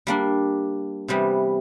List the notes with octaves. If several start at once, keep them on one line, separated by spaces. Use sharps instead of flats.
G3 A#3 D4
C3 E3 G3 B3